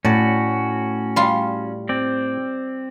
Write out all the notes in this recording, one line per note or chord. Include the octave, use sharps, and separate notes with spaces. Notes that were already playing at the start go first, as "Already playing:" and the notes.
A2 C#4 F#4 D5
G3 F4
C4 D5